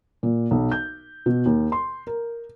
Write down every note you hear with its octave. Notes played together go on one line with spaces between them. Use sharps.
A#2
B1
G6
B2
D#2
C6
A#4